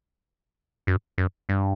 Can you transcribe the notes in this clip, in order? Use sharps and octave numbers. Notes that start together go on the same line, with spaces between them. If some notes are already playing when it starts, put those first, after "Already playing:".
F#2
F#2
G2